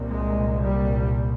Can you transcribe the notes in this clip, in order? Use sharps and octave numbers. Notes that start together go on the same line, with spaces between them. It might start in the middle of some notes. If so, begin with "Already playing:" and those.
Already playing: C2 A#2
G#3
G3